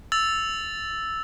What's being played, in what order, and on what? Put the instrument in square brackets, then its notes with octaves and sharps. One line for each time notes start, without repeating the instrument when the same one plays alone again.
[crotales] E6 A6 F7